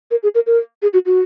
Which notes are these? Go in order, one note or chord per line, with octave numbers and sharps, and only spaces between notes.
A#4
G#4
A#4
A#4
G#4
F#4
F#4